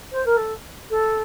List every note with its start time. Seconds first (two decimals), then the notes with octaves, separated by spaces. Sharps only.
0.12 C5
0.25 A#4
0.37 A4
0.90 A4